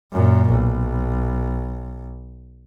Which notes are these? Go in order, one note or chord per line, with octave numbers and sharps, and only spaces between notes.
F#2 A#2
B1